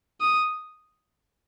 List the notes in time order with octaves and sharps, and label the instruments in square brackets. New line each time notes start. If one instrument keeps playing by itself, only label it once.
[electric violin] D#6